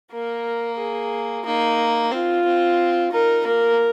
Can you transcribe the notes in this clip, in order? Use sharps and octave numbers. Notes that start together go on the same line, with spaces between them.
A#3 A#4
G#4
A#3 D#4
C4 F4
C4
D#4 A#4
A#3 A#4